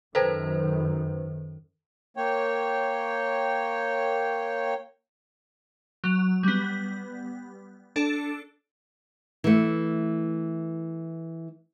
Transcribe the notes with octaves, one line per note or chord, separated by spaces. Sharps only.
F#2 D#3 A4 B4 C5
A#3 C#5 G5
F#3
G3 B3
D4 A4
E3 A3